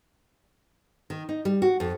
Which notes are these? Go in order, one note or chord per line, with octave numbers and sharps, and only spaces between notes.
D#3
D#4
G3
F#4
F2